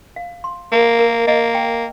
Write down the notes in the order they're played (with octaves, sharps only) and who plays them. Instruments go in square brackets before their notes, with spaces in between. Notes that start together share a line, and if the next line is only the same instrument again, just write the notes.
[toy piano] F5
C6
[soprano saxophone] A#3 [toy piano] A#4
[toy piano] A#4
[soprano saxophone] A#3 [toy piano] D#5
[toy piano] G5